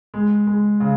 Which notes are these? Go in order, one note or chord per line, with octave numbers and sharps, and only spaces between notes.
G#3
G#3
C#3